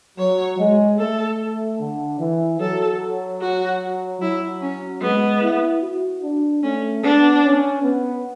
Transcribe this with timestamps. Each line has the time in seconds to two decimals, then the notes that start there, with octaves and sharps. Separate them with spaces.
0.18 F#3 C#5
0.59 G#3
0.99 A3 A4
1.80 D3
2.20 E3
2.60 F#3 A4
3.41 F#4
4.21 F#3 E4
4.62 C#4
5.02 G#3 B3
5.42 E4
5.83 F#4
6.23 D4
6.63 A3 C#4
7.03 B3 D4
7.44 C#4
7.84 B3